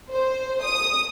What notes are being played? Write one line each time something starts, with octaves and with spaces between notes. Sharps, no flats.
C5
D#6